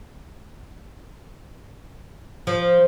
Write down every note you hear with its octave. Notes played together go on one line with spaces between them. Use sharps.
F3